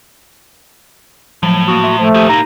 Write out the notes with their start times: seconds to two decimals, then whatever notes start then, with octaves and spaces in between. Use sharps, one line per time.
1.43 A2 F3 F#3
1.68 A#3 F#4 D#6
1.84 E5 C6
1.98 F3 A3
2.14 A#2 D#3 G4 G6 D#7
2.30 A2 A#3 D#4 A#5